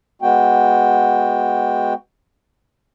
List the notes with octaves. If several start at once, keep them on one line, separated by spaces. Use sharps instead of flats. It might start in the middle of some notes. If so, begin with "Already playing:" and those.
G#3 B3 F#4 G5